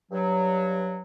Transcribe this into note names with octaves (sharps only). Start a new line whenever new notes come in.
G2 F#3